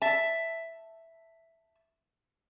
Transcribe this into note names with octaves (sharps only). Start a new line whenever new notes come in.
E5 A5